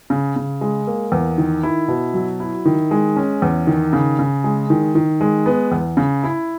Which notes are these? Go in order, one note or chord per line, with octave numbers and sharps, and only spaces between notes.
C#3
C#3
G#3
A#3
E2
D#3
E4
B2
F#3
E4
D#3
G#3
C#4
E2
D#3
C#3
C#3
G#3
D#3
D#3
G#3
B3
E2
C#3
E4